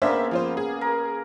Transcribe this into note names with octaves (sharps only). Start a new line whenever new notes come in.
C#3 A#3 B3 D4 C5 E5
F3 F4 C5
G#4
A#4